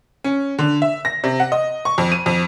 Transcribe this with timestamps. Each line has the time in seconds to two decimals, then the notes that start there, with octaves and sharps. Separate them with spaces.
0.24 C#4
0.59 D3
0.82 E5
1.05 A#6
1.24 C3
1.40 F#5
1.52 D#5
1.85 C#6
1.98 F2
2.12 D#7
2.26 F2